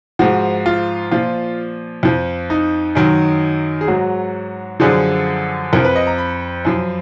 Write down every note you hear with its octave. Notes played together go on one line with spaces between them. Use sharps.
G#2 F3 F#4
F4
A#2 F3 F4
F2 F3
D#4
F#2 D#3 F#3
G#4
G#2 F#3 F#4
F#2 D3 F3 G#4
F2 F3 A#4
B4
D#5
A#5
B5
F#2 F3